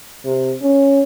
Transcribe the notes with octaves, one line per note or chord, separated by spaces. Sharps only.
C3
C#4